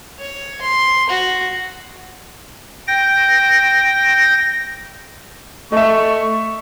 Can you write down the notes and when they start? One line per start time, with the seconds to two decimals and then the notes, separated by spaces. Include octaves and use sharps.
0.19 C#5
0.62 C6
1.10 F#4
2.88 G5 A#6
5.72 A3 D#5 E5 C#6